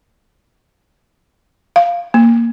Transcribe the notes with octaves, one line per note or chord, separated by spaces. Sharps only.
F5
A#3